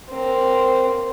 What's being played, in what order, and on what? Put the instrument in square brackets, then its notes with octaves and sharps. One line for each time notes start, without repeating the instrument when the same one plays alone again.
[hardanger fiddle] A#3 C4